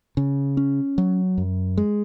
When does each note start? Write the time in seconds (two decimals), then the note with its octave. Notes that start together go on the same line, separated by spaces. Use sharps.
0.17 C#3
0.57 C#4
0.98 F#3
1.38 F#2
1.78 G#3